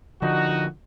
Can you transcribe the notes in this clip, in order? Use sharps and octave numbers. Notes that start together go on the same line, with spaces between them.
D3 F3 D#4 F#4